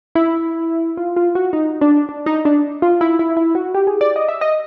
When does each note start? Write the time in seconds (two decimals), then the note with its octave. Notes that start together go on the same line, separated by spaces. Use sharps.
0.15 E4
0.97 F4
1.16 F4
1.35 F#4
1.53 D#4
1.81 D4
2.09 D4
2.26 D#4
2.45 D4
2.82 F4
3.01 E4
3.19 E4
3.37 E4
3.55 F#4
3.74 G4
3.87 G#4
4.01 D5
4.16 D#5
4.28 E5
4.41 D#5